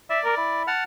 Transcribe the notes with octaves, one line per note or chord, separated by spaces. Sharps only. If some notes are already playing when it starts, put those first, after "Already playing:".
D5 E5
A#4
E4
F#5 A5 F6